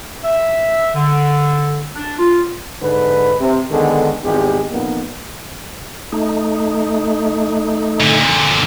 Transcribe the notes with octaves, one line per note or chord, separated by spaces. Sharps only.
E5
D3
D4
F4
G#2 D3 B4
C3
D3 D#3 G#3 B3 A4
G#1 E2 G#3 G4
F2 A#2 A#3 B3 D#4
A3 D#4
A#2 D3